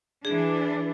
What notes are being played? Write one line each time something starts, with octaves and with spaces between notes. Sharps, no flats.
E3 D4 G#4